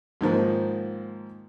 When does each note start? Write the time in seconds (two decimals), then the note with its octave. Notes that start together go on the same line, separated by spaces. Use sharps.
0.21 G#2 D#3 F3 A#3